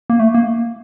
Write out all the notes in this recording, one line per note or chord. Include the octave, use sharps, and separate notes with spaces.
A#3
A3
A#3